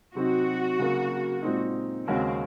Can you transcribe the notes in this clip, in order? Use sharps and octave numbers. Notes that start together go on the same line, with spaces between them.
C3 F#3 C4 D#4 F#4
C#3 F#3 A#3
A#2 G#3 C4 D#4
D#2 C#3 G#3 C4 C#4 F#4